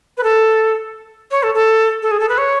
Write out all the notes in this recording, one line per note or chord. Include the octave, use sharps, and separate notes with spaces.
B4
A4
C#5
A4
A4
A4
G#4
A4
B4
C#5